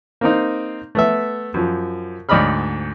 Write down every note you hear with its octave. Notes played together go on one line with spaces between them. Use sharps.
A#3 C4 D#4
A3 B3 E5
F#2 F3
D2 G#2 D5 D#5 B5 F6